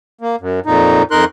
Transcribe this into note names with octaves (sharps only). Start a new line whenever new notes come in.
A#3
F#2
F2 A#2 D#4
F2 D#4 A#4 C6 F#6